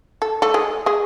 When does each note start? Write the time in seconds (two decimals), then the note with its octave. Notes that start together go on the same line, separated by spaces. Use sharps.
0.22 A4
0.42 A3 A4
0.54 G#3 G#4
0.86 G#3 G#4